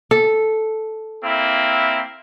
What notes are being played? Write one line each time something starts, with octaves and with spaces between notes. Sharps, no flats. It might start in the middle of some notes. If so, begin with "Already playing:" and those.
A4
A#3 C4 E4